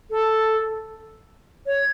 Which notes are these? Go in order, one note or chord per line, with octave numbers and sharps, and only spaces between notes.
A4
C#5